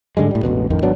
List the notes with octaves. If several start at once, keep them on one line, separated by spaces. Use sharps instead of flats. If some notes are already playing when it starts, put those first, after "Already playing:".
G#2 D3 G3 G#3
A2 G3
E1 A1 B2
A1 F2 D#3
G#1 F#3 B3 D4